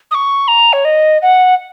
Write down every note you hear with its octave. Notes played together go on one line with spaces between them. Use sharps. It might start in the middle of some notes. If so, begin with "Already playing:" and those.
D#6
C#6
A#5
C#5
D#5
F#5